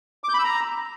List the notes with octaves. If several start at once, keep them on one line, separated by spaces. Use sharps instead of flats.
D6
G6
B5
E6
A#5